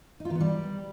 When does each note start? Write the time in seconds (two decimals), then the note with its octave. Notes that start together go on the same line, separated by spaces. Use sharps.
0.20 D#4
0.25 F4
0.30 D#3
0.35 B3
0.40 G3